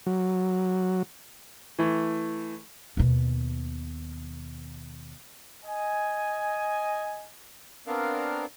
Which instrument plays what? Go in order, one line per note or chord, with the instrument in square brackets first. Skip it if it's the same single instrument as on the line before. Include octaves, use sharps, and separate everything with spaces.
[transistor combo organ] F#3
[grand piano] E3 A3
[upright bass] D#2 B2
[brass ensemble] D#5 G#5
[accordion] B3 C4 D4 A#4 F5